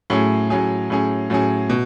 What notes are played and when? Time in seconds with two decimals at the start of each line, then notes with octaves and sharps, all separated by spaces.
0.10 A2 F#3 C#4 G#4
0.50 A2 F#3 C#4 G#4
0.90 A2 F#3 C#4 G#4
1.30 A2 F#3 C#4 G#4
1.70 B2